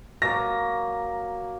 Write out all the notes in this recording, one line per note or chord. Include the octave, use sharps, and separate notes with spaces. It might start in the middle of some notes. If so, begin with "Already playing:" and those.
F#3 A#3 A#5 A#6